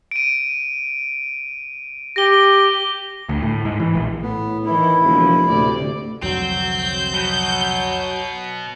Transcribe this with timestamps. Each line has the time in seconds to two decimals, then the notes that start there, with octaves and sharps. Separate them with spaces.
0.11 D7 D#7
2.16 G4 A#6 G7
3.29 D2
3.43 A2
3.65 G#2
3.80 E3
3.95 A#1
4.22 A2 B3
4.65 D#3 E3 E4
5.04 E1 C#3 F3 A#3
5.49 D2 A2 C3 D5
6.23 C2 F2 D3 F#3 C4 G6
7.14 B2 F#3